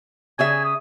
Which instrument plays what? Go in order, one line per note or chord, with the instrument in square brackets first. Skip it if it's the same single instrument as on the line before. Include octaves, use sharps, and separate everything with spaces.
[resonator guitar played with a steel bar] C#3 G#4 E5 [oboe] G#5
[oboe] D#6